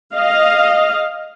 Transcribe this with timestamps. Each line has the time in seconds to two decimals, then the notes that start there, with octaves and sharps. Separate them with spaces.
0.15 D#5 F5